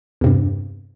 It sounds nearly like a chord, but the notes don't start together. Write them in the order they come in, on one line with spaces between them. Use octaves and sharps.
E2 C3 G2